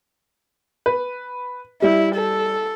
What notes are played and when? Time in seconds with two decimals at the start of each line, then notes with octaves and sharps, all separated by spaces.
0.86 B4
1.82 G3 E4
2.15 A4